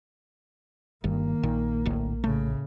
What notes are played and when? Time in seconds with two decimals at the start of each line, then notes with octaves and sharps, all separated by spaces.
1.04 G1 G2 D#3 A#3
1.43 A#1 A#2 D#3
1.86 D1 D2 A2
2.24 A2 C#3 A3